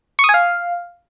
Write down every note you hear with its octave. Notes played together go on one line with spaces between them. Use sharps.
C#6
D#6
G#5
F5